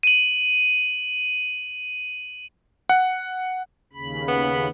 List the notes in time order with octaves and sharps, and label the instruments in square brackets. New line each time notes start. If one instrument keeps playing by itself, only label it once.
[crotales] D#7 F#7
[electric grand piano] F#5
[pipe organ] D#2 C#3 B5
[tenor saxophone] B3